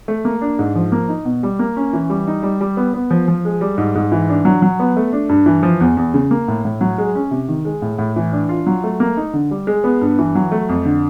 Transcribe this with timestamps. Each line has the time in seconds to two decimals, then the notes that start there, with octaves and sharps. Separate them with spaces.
0.08 A3
0.25 A#3
0.41 D4
0.59 G#2
0.76 F3
0.92 A#3
1.09 D#4
1.25 B2
1.43 G3
1.59 A#3
1.77 C#4
1.93 E3
2.10 G3
2.27 D#4
2.43 G3
2.61 G3
2.77 B3
2.94 B3
3.11 F3
3.28 F3
3.45 G#3
3.61 G3
3.78 G#2
3.95 G#2
4.12 E3
4.29 D4
4.45 F#3
4.62 F#3
4.80 B3
4.97 A3
5.13 D4
5.29 G2
5.46 E3
5.63 F3
5.81 E2
5.97 E2
6.14 C#3
6.31 A#3
6.48 A2
6.65 A2
6.81 F#3
6.98 G#3
7.15 C#4
7.31 C3
7.48 D#3
7.65 G#3
7.82 A2
7.99 A2
8.16 E3
8.32 D4
8.49 F4
8.67 F#3
8.84 A3
9.00 A#3
9.17 D#4
9.33 D3
9.51 G3
9.67 G#3
9.84 B3
10.01 G2
10.19 E3
10.35 F#3
10.52 A3
10.69 F2
10.85 D3